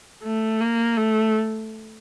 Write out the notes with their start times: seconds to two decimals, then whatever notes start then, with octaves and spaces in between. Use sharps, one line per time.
0.24 A3
0.61 A#3
0.97 A3